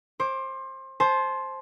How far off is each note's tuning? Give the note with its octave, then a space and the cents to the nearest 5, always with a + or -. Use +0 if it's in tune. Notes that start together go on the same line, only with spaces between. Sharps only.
C5 +25 D6 +0
C5 +10 A5 -30